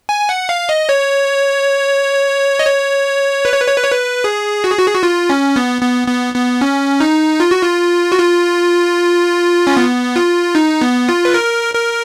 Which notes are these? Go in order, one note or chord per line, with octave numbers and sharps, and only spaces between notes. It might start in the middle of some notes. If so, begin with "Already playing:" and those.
G#5
F#5
F5
D#5
C#5
D#5
C#5
B4
C#5
B4
C#5
B4
C#5
B4
G#4
F#4
G#4
F#4
G#4
F#4
F4
C#4
B3
B3
B3
B3
C#4
D#4
F4
F#4
F4
F#4
F4
C#4
B3
F4
D#4
B3
F4
B4
A#4
A#4